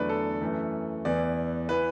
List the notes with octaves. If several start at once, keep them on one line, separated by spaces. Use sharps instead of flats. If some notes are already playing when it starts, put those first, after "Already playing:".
Already playing: E2 D3 F#3 A3 B4 D5
A4
F#2 E3 A3
E2 E3 B3 D5
E3 B3 B4